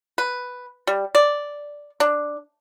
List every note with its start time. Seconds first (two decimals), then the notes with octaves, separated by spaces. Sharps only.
0.18 B4
0.87 G3
1.15 D5
2.00 D4